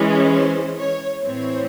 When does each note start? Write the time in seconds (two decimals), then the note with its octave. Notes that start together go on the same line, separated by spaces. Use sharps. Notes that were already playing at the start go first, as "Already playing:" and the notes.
Already playing: E3 G#3 C#4
0.32 C5
0.78 C#5
1.24 A2 E3 C4 C#5